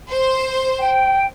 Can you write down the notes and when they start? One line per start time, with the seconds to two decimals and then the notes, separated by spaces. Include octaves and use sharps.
0.10 C5
0.79 G5